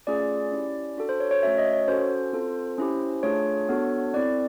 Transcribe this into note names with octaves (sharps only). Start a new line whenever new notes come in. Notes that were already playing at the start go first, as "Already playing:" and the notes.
A3 C#4 F4 G#4 D5
C#4 E4 G4
D4 F#4 A4
C5
C#5
C#5
A3 C#4 F#4 E5
D#5
C#5
C#4 F#4 A4 C5
C4 F4 A4
C#4 E4 G4
A3 D4 F4 G#4 C#5
B3 D4 F#4 A4
C4 E4 A4 D5